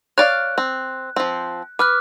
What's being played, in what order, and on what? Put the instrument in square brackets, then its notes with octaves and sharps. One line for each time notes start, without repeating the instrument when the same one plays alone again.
[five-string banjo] C#5 D5 F5 [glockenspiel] F#6
[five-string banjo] C4
F3 C4
[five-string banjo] B4 [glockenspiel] D6 F6 F#6